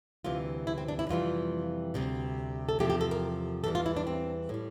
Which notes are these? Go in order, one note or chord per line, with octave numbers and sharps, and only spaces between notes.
D2 C3 E3 G3 F4
E4
C4
D4
E4
F2 C3 E3 G3 F4
D2 C3 G3
A4
E2 C3 F3 A3 G4
G4
A4
A#4
E2 E3 G3 A4
F4
E4
D4
C4
A2 G3